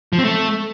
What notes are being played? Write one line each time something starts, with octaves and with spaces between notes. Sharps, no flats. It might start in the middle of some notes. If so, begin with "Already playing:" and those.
F3
C4
A3